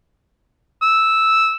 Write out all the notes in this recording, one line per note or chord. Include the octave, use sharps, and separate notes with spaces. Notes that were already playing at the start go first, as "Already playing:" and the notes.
E6